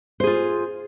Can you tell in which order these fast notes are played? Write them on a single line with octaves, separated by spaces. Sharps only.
C5 G#4 F4